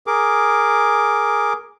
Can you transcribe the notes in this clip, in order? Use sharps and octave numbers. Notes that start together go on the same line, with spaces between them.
G#4 A#4 D6